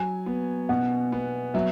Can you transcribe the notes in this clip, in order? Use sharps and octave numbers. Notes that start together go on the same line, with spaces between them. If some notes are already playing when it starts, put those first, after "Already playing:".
Already playing: F#3 G#5
B3
B2 F#5
B3
F#3 E5